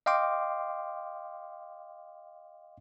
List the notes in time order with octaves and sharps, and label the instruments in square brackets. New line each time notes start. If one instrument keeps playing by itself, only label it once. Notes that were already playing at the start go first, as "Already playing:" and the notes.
[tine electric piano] D#5 F5 G5 C6 D6